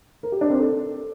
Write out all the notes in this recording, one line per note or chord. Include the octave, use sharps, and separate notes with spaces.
A#4
G4
D4
C4
A4